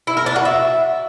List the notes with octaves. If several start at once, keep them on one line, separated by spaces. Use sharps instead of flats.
E4
A#4
D4
F#4
E5